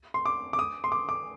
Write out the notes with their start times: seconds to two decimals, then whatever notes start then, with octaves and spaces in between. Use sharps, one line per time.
0.14 C6
0.26 D6
0.53 D6
0.59 D#6
0.84 C6
0.92 D6
1.09 D6